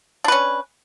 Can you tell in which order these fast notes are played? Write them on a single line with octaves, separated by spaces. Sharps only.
D4 B4 C#4